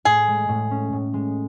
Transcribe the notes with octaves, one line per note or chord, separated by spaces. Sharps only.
A2 G#4
G#3
A2
C#4
A2
G#3